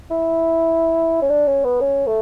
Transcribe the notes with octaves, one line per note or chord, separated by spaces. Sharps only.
E4
C#4
D4
C#4
B3
C#4
A3